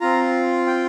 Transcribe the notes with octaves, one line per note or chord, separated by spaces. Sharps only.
C4 F4 A#5
G5